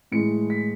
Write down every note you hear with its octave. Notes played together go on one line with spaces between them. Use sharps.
A2 E3 G#3 C#7
B6